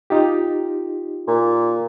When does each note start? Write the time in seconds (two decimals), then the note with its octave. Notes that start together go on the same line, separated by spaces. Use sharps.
0.10 D#4 F4 G4
1.28 A#2